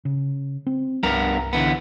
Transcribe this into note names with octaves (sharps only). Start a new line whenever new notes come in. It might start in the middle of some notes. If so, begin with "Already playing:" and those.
C#3
C4
C2 G2 B3 A#4
D3 E3 B3